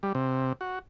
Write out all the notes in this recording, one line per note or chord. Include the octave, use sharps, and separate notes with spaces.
G3
C3
F#4